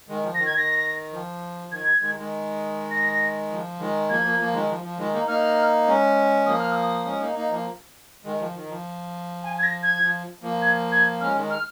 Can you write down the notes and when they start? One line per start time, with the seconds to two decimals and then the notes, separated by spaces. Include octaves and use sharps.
0.09 D#3 G#3
0.23 F3
0.35 D#3 A#6
0.46 G#6
0.53 D#3 A#6
1.12 F3
1.71 D#3 G#6
2.01 D#3 G#3
2.16 D#3 G#3
2.91 A#6
3.50 F3
3.79 D#3 G#3
4.09 F3 A#3 G#6
4.23 F3 A#3
4.39 F3 A#3
4.53 D#3 G#3
4.69 F3
4.83 F3
4.98 D#3 G#3
5.14 A#3 D#4
5.27 A#3 D#4 F6
5.87 G#3 C#4
6.46 F3 A#3 D#6
6.59 F6
6.72 D#6
7.05 G#3 C#4
7.21 A#3 D#4
7.35 A#3 D#4
7.50 F3 A#3
8.25 D#3 G#3
8.40 F3
8.54 D#3
8.69 F3
9.44 G#5
9.58 G#6
9.63 A#6
9.83 G#6
10.02 F3
10.42 F3 A#3
10.62 G#6
10.92 G#6
11.21 G#3 C#4 F6
11.36 D#3 G#3
11.50 F6